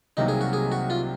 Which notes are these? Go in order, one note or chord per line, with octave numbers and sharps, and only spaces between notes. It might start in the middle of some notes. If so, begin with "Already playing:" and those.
C2 C3 D#3 F#3 A#3 D#4
G#4
F#4
G#4
F#4
F4